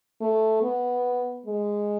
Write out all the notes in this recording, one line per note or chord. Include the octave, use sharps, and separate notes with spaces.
A3
B3
G#3